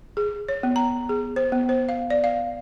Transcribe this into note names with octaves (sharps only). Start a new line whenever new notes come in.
G#4
C#5
B3
A#5
G#4
C5
B3
C5
F5
D5
F5